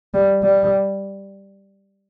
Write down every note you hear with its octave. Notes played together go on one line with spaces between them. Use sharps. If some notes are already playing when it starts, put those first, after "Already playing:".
G3
G3